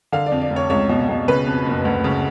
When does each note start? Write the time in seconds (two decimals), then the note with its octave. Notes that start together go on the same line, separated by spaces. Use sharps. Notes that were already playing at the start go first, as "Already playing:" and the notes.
0.12 D3 F5
0.26 D5
0.32 F2
0.41 D5
0.50 F1
0.56 C#5
0.70 C#2 C#5
0.89 B2
1.09 B2
1.28 C#3 B4
1.47 F2
1.66 F#1
1.85 D2
2.04 C#3